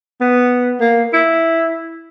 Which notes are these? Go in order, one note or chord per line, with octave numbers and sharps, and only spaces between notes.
B3
A#3
E4